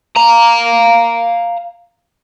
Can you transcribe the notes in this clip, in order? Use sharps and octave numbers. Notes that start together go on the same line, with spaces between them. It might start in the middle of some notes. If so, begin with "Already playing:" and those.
F5 A#5